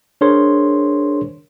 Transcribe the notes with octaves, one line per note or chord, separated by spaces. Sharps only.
D4 G#4 A#4 C5 C#5 C6